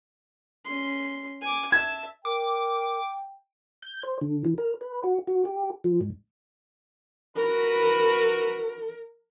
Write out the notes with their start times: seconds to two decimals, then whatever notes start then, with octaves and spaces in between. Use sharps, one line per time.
0.66 C#4 C6
1.42 G#5 D6
1.72 E5 A5 G#6
2.25 A#4 G5 D6
3.82 G6
4.03 C5
4.21 D3
4.45 E3
4.58 A#4
4.81 B4
5.03 F#4
5.27 F#4
5.45 G4
5.84 F3
6.01 G#2
7.37 F#4 A#4 B4